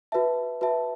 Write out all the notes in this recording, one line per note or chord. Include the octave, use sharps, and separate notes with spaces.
F#4 B4 E5 A5
F#4 B4 E5 A5